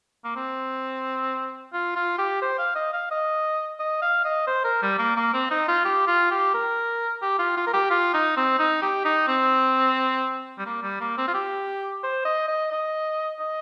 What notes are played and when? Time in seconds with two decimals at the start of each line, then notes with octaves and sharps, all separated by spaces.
0.24 A#3
0.36 C4
1.73 F4
1.96 F4
2.18 G4
2.42 C5
2.59 F5
2.75 D#5
2.93 F5
3.11 D#5
3.80 D#5
4.02 F5
4.25 D#5
4.47 C5
4.64 A#4
4.82 G3
4.99 A#3
5.16 A#3
5.34 C4
5.51 D#4
5.68 F4
5.85 G4
6.07 F4
6.31 G4
6.54 A#4
7.22 G4
7.39 F4
7.57 F4
7.67 A#4
7.73 G4
7.90 F4
8.14 D#4
8.37 C4
8.59 D#4
8.82 G4
9.05 D#4
9.28 C4
10.58 G3
10.66 A#3
10.82 G3
11.00 A#3
11.17 C4
11.28 F4
11.34 G4
12.03 C5
12.25 D#5
12.48 D#5
12.72 D#5
13.39 D#5